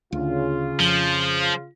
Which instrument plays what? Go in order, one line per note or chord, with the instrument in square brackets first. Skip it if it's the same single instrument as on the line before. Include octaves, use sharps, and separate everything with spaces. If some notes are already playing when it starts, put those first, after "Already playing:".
[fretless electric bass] D2 [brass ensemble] C#3 F4
[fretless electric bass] F2 [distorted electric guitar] F3